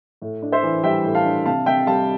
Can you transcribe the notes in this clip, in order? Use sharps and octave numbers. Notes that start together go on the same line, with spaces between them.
A2
D4
C5 E5
E3
G3 E5 G5
A2
F5 A5
D4
C3 F5 A5
C3 E5 G5
G3 F5 A5